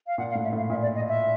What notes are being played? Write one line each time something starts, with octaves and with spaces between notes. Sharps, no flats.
F5
A#2 F#5
F5
A2
E5
A2 F5
A#2 E5
D5
D#5
E5